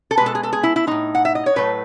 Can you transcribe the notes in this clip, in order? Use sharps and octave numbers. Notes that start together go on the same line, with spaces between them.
A4
B2 G#3 B4
A4
G#4
A4
G#4
E4
E4
A2 G#3 D#4
F#5
E5
D#5
C#5
A2 F#3 A3 B4